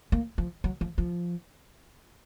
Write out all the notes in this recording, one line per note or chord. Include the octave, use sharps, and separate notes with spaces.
A#3
F3
F#3
F3
F3